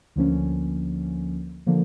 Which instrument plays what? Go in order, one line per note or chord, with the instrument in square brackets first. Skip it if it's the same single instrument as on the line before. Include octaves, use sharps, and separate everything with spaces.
[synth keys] D2 D3 F3 A#3 C#4
D3 F3 A#3